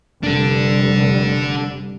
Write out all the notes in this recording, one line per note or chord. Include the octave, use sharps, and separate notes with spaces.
F1 D3 G3 D4 A4